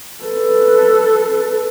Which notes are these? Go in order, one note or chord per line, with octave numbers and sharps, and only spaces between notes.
A4 B4